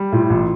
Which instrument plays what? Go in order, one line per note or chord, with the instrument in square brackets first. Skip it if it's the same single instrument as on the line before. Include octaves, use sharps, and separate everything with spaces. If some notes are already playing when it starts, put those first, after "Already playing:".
Already playing: [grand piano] G3
[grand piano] A2 [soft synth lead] F4
[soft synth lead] E4
[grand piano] A1 [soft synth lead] F4